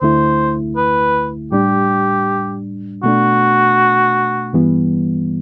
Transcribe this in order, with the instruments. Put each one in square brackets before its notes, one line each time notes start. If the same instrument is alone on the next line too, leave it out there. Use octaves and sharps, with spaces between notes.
[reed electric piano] D2 D3 A3 E4 [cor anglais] C5
[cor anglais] B4
[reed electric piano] A2 G3 D4 [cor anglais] G4
[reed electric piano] B2 A3 D4 [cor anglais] F#4
[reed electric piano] G2 E3 G3 B3